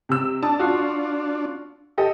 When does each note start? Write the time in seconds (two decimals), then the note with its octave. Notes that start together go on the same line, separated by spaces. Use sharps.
0.09 C3 E6
0.43 D4 A5 D#6
0.59 F4 F#4
1.98 G4 A4 D#5